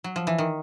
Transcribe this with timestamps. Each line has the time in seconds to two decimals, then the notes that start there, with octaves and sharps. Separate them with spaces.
0.04 F#3
0.16 F3
0.27 E3
0.38 D#3